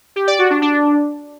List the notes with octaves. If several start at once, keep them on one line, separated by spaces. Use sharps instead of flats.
G4
D5
F#4
D4
D4